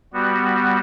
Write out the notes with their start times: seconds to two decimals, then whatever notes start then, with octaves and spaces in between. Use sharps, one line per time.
0.13 G3 B3 F#4